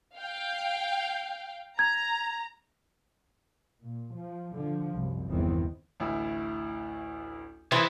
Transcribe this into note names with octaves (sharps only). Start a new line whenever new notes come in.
F5 G5
A#5 G#6
A#2
F3
D3 F3
C2 F#2
G1 E2 D#3 E3 B3 C4
A1 D2 E4
D#3 E3 C4 E4 G#4